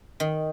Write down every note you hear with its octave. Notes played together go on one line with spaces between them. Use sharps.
D#3